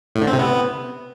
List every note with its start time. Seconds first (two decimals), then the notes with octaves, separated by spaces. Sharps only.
0.15 A2
0.21 D3
0.27 C4
0.33 C3
0.39 B3